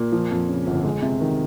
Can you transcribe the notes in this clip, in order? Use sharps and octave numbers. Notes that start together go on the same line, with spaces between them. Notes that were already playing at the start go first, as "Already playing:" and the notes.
Already playing: A#2
F3
F2
C#3
G1
G#3
C3
D#3